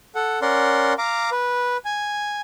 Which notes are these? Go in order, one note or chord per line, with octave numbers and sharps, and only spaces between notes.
A4 F#5
C#4 A#4 D5 F#5 C6
F5 A#5 D6
B4
G#5